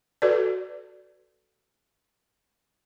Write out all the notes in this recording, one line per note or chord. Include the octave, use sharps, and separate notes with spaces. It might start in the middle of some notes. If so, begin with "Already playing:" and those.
F#4 A4 B4 D5